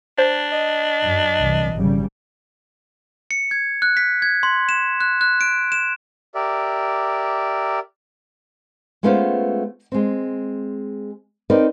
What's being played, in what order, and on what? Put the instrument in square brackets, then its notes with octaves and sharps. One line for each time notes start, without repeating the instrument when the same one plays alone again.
[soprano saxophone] D4 [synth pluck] C5
[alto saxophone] D#5
[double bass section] F#2
C2 E3
G#1 C#3 G3
[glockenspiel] C#7
G#6
F#6
B6
G#6
C6
E7
F#6
F#6
D7
E7
[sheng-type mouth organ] G4 A#4 D5 E5
[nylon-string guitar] G#3 A3 B3 C#4 F4 C5
G#3 C4
C4 D#4 A#4 B4 D5